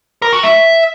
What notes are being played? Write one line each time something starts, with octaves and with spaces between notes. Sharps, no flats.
A#4
F#4
E5